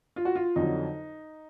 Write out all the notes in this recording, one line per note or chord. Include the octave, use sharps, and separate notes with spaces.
F4
F#4
F4
F2 D3 F#3 D#4